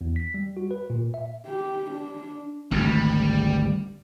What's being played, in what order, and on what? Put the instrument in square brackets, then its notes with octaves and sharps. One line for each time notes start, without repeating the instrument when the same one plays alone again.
[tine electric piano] E2
B6
G3
F#4
B4
A#2
E5
[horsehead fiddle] G4
D4
[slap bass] G#1 D2 G2 [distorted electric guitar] G3